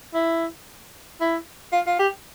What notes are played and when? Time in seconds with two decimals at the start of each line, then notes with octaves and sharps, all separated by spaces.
0.14 E4
1.20 E4
1.72 F4
1.87 F4
1.99 G4